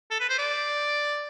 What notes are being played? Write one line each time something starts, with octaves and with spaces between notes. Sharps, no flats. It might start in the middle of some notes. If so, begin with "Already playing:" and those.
A4
B4
C5
D5